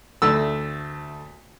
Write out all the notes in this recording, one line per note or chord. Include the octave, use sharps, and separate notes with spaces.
D2 A3 E6